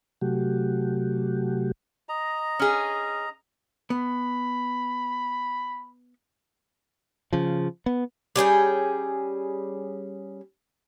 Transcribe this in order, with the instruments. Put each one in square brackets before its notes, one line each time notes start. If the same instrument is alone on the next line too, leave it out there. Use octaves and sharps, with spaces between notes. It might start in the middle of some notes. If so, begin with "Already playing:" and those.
[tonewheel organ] C3 F#3 A3 F#4 G4
[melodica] D#5 A#5
[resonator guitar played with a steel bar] C#4 G#4
[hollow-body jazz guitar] B3 [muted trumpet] B5
[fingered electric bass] C#3 F3
B3
[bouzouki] G3 C#4 G#4 G5